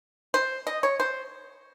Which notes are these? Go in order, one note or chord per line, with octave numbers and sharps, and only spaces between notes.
C5
D#5
C#5
C5